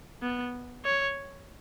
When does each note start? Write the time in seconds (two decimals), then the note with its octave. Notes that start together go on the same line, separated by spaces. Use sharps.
0.22 B3
0.85 C#5